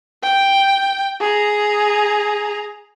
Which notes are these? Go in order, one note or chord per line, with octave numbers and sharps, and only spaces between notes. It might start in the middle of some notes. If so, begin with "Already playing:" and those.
G5
G#4 A#5